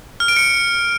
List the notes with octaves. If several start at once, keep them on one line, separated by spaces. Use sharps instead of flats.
F6
D7
C#7